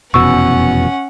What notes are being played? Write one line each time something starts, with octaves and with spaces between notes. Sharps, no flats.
F1 E2 B2 C#4 F#5 C#6 E6